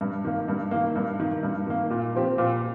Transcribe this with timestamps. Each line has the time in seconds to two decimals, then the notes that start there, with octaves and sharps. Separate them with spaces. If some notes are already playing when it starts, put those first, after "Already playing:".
0.01 G2
0.25 D#3 A#3
0.48 G2
0.71 D#3 A#3
0.96 G2
1.20 D#3 A#3
1.43 G2
1.67 D#3 A#3
1.90 A#2
2.15 F3 C4 G4
2.38 A#2